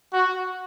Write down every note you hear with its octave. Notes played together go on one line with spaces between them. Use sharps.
F#4